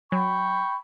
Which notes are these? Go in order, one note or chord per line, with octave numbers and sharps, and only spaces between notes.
F#3 G5 B5 C#6